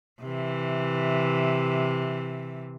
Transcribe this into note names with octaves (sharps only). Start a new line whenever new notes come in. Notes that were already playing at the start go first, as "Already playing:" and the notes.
C3 E3